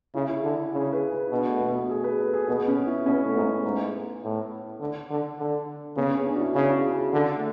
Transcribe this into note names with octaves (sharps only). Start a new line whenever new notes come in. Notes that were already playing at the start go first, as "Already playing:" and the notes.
C#3 E4
E4
D3
C#3 G#4
B4
E4
B2 D4
A3
B3
F#4
G#4
B4
A4
G#4
B2 B3
C#4
E4
B2 C#4
A3
G#2 B3
G#2
A2
D3
D3
D3
C#3 B3
C#4
D4
F#4
E4
C#3 D4
G#4
F#4
E4
D3 D4
A3